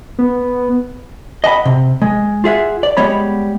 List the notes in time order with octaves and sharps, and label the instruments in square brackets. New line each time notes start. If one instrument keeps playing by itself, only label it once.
[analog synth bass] B3
[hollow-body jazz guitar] D#5 F#5 G#5 B5
C3
G#3
F4 G#4 E5 F#5
D5
G3 G#3 B3 C#5 B5